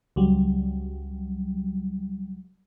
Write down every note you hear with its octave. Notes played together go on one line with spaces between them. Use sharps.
C#2 F#3 G3